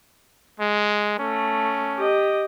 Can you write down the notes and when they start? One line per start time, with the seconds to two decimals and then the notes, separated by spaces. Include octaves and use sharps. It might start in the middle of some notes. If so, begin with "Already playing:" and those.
0.60 G#3
1.19 A3 C#4
1.96 G4 D#5